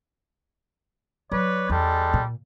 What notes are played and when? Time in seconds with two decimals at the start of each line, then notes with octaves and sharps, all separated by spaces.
1.32 F#3 B4 C#5 D5
1.69 E2 G3 G#3 A4
2.14 A#2